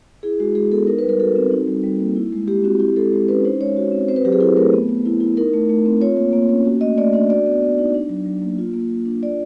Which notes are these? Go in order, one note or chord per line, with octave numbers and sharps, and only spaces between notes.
E4 G#4
G#3 F#4
G#3 G#4
B3 A4
D#4 A#4
B4
G3 A#4
F#4 A4
C4
D#4
G3
G3
A#3
E4
G#3
G#3 G4
C4 F#4
E4 G4
G#3 A4
G#3
C#4 B4
D#4 C5
G#3 C#5
F#4
C4
C4 C5
B4
F#3 G4
G#4
E4 A4
A3 A#4
B3
B3
E4
E4
D#4 A#4
A3
A3
C4
F4 C#5
A#3
A#3
C#4
F#4
A3 D#5
A3 D5
D4 D5
F#4 D5
B3
B3
D#4
D4
F#3
F#3
A#3
F4
A#3
A#3
D4
F4 D5